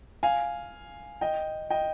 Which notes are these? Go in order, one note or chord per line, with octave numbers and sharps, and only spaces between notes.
F5 G#5
D#5 G5
D#5 G5